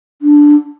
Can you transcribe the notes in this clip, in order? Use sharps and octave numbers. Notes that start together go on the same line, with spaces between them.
D4